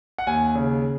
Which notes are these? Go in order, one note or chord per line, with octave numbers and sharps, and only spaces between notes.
F#5
D#2 G#5
C#3